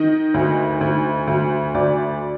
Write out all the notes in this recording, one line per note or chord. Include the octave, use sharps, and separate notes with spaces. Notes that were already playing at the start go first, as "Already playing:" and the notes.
Already playing: D#3 D#5
D2
D2
D2
D2 D5